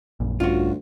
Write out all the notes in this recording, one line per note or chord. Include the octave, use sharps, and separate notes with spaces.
A#1 F#2 A#2
D2 G2 C#4 F4 F#4